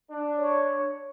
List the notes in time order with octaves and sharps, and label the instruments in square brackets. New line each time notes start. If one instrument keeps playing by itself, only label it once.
[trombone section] D4
[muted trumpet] C#5